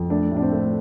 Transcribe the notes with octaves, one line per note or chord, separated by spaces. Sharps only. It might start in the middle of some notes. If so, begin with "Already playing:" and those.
Already playing: F2
A3 D4
A2 D4
C4
A3